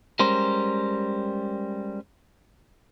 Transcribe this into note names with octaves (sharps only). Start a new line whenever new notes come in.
G3 G#3 C#4 A#4 C5